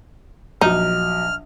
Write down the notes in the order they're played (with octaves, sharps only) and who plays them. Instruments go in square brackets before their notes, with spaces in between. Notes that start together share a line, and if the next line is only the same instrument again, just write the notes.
[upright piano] A#1 F#3 [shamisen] D#4 [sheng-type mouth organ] F6